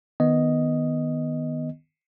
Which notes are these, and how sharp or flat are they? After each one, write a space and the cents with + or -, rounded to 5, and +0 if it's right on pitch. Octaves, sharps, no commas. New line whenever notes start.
D#3 -5 B3 +0 D#5 +0